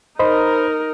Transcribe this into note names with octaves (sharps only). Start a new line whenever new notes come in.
D#4 A#4 C5 D#5 B5